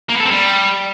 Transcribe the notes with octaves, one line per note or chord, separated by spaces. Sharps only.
A#3
B3
A4
C4
G3